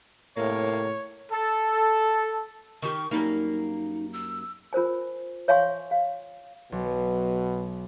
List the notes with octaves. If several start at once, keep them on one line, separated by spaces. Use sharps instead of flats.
A2 C3 A#3 C#5
A4
D#3 G4 C#6
F#2 G3 A#3 D#4
E6
F4 A#4 C5 G#5
C#5 E5 F5 G#5 C6 C#6
F5
B1 B2